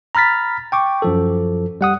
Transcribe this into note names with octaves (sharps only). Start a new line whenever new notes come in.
A#5 B5 F6 A6 B6
G5 C#6 D6
F#2 F3 A4
G3 F#5 D#6